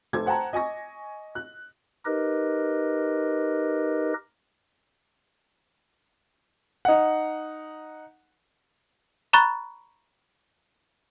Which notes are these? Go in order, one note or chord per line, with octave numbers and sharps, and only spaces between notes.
F1 A4 C5 D6 G#6
C5 F#5 G5 A5 A#5
D#5 G#5 C#6 A#6
F#6
D#4 G4 A#4 B4 D#5
D#4 F#5
A#5 B5 C#6 F#6 A6